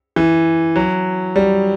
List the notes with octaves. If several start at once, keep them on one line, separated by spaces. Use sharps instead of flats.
E3
F#3
G3